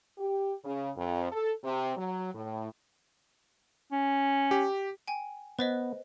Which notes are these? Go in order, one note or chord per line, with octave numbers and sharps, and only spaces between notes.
G4
C#3
F2
A4
C3
F#3
A2
C#4
G4
G5 G#5
B3 B4 C5 D#5